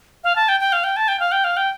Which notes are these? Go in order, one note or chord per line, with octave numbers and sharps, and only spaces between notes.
F5
A5
G5
G5
F5
G5
A5
G5
F5
G5
F5
G5